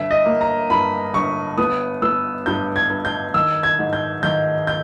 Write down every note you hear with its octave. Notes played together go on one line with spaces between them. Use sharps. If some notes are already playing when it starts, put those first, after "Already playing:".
Already playing: G1 E5
D#5
A#3
A#5
G2 B5
G1 C#6
B3 D#6
B3 E6
G2 G6
G#6
G2
G6
D#3 E6
G#6
G#2
G6
D#3 G6
G6